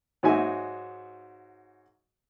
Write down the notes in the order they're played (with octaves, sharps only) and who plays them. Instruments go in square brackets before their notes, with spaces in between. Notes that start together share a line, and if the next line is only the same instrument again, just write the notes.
[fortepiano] G#2 F#3 D#4 F#4 E5 G#5